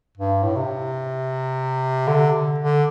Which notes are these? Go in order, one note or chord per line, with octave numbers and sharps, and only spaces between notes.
G2
A2
C3
D3
D3